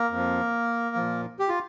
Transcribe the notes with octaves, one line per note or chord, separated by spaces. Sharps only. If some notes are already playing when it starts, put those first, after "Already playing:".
Already playing: A#3 A#4
F2 F3
A#2 F3
G4
F4